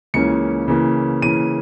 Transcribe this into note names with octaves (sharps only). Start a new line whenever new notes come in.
C#2 C#3 E3 A#3 C#4 C#7
C#3 E3 A#3
C#3 E3 A#3 D#7